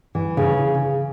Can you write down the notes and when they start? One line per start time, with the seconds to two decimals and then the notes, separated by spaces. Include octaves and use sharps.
0.15 E3
0.37 C#3